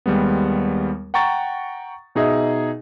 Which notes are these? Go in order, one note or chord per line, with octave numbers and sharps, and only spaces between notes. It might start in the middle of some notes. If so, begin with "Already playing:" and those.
D#2 G3 G#3 B3
F#5 G5 A#5 C#6 A6
B2 D#4 G#4 D#5 E5